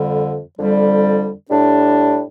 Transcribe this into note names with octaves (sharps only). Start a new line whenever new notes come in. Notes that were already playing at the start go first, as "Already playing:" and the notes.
Already playing: F2 D3 G3
F2 D3 G3
A2 G3 D4